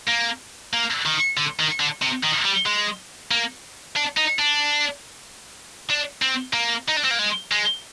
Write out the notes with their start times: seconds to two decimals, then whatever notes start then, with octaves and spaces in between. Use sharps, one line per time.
0.08 A#3
0.73 A#3
1.05 D#3
1.37 D3
1.60 D#3
1.80 D3
2.02 C3
2.24 D#3
2.45 G3
2.66 G#3
3.31 A#3
3.96 D4
4.17 D#4
4.39 D4
5.90 D4
6.22 C4
6.54 A#3
6.89 D#4
6.97 D4
7.04 C4
7.11 A#3
7.19 G#3
7.52 G#3